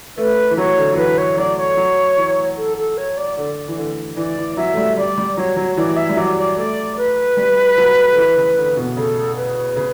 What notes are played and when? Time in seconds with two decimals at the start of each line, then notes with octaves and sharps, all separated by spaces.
0.17 A3 B4
0.51 E3
0.57 F#3 C#5
0.78 D3
0.93 F#3
0.97 E3 B4
1.18 C#5
1.37 F#3 D5
1.57 C#5
1.77 F#3
2.17 E3
2.57 A4
2.77 A4
2.98 C#5
3.17 D5
3.37 D3 D5
3.68 E3
3.77 D3
4.17 E3 D5
4.38 E3
4.57 F#3 E5
4.73 A3
4.77 G3
4.97 G3 D5
5.18 G3
5.37 F#3 C#5
5.57 F#3
5.77 E3 D5
5.96 E5
6.09 G3
6.16 F#3 D5
6.37 D5
6.57 A3 D5
6.97 B4
7.37 G3
7.77 F#3
8.12 D3
8.17 E3
8.37 C#3
8.57 D3
8.77 B2
8.96 C#3 A4
9.37 B4
9.76 C#3